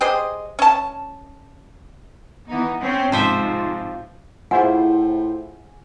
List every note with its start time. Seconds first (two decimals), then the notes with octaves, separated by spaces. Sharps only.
0.01 G4 G#4 C5 D#5
0.59 C#4 A5
2.48 E3 B3 D#4
2.80 C4 C#4
3.12 G#2 C3 F3 F4 C5 E5
4.51 A2 E4 F4 G#4 C5 F#5 G#5